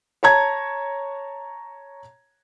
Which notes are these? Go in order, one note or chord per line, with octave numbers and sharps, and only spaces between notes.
C#5 A5 A#5 G#6